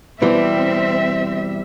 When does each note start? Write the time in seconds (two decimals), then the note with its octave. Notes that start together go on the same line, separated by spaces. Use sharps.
0.22 B2 E3 G3 C4 E5